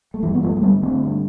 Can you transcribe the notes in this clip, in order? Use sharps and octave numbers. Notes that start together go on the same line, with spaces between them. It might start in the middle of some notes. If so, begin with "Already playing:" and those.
A3
G2 E3 G3
B3
G2 F3 A3
A3
D3 G3 B3
D3 A3 C4
G2